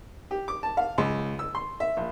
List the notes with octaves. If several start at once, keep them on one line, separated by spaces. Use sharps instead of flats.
G4
D6
A5
F5
C#2
E6
C6
E5
A#1